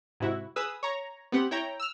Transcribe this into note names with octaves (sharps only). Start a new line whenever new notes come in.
G#2 C3 E4 F#4
G#4 B4 D#6 E6
C#5 A#5
B3 C4 G4 F#5
E4 C#5 G5 A#5
E6 F6